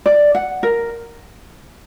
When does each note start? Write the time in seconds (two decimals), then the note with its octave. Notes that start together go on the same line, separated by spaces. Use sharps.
0.06 D5
0.35 F#5
0.63 A#4